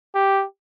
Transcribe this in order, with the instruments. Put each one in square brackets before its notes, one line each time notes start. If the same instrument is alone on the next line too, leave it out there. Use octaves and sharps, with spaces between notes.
[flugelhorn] G4